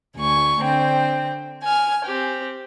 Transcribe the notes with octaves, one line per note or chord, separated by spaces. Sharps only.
D2 G#5 C#6
D3 C4 G5
G#5 F6
C4 G4